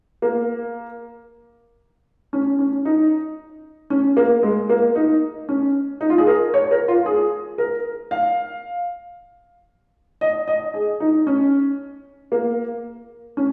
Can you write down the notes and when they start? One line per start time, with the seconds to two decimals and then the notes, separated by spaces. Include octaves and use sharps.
0.22 A#3
2.33 C#4
2.59 C#4
2.85 D#4
3.90 C#4
4.17 A#3
4.43 G#3
4.69 A#3
4.95 D#4
5.49 C#4
6.01 D#4
6.10 F4
6.18 G#4
6.27 A#4
6.54 C#5
6.71 A#4
6.88 F4
7.06 G#4
7.58 A#4
8.11 F5
10.21 D#5
10.48 D#5
10.74 G#4
11.00 D#4
11.27 C#4
12.32 A#3
13.37 C#4